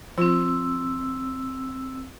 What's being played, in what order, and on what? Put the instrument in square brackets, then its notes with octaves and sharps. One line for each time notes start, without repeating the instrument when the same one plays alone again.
[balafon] F3 F4 [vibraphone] C4 E6